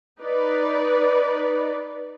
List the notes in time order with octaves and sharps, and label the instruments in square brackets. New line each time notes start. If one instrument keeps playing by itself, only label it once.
[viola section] D#4 B4 D5